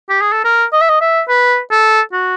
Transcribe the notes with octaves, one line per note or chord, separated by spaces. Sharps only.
G4
G#4
A4
A#4
D#5
E5
D#5
E5
B4
A4
F#4